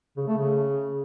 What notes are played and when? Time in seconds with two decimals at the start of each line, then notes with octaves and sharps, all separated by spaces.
0.17 C#3
0.27 A3
0.38 C#3